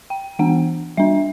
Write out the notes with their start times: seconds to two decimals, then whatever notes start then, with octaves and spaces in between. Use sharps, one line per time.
0.10 G5
0.39 E3 B3 D4 F#5
0.97 G3 D4 E5